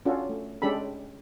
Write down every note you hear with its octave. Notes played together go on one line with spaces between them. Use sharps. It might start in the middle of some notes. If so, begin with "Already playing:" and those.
C#4 D4 F4 F#4 A4
A3
G#3 C#4 D4 G4 A4 B5